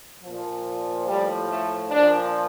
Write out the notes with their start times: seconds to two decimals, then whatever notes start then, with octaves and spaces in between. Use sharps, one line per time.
0.23 A#2 F3
1.06 A2 F3 G3
1.48 A3
1.89 A#2 F3 D4